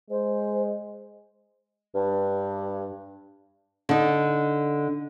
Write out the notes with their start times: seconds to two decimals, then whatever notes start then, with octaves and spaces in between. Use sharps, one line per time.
0.10 G#3 C5
1.95 G2
3.89 D3 D#4